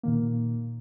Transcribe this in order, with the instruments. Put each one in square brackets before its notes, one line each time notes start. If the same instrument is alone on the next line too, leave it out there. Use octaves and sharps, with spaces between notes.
[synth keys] A#2 D#3 A#3